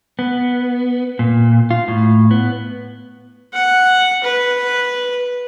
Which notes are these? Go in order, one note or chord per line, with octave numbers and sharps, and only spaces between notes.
B3
A#2
F4
A2
B3
F#5
B4